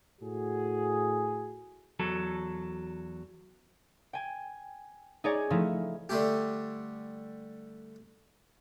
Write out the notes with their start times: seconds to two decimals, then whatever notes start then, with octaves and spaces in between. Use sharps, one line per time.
0.21 A2 F#4 G#4
1.99 E2 F#3 A4
4.13 G5 G#5
5.24 D#4 G#4 C#5 D5 G#5
5.50 F3 A3 D#4 E4
6.09 D3 G3 A3 G4